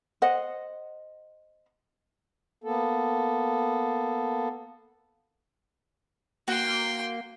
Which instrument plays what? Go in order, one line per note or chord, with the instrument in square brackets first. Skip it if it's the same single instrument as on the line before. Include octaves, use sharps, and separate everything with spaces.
[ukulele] C5 D#5 F#5
[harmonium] A#3 B3 A4
[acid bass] A#3 [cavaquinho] F#4 [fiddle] G5 C6